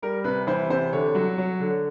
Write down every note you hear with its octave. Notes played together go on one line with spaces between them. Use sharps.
G3 A#4
C3 B4
E3 C5
C3 C5
D3 C#5
F#3
F#3
D3